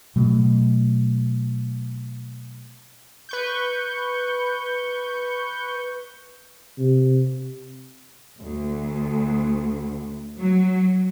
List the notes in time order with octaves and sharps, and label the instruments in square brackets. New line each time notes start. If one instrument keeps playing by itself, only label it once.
[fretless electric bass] B2 F#3 A3
[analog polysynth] B4 C#6 G6
[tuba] C3
[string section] D2
F#3